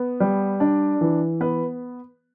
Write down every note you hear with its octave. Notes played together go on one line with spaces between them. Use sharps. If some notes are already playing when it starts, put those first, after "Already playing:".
Already playing: B3
G3
D4
E3
B3 B4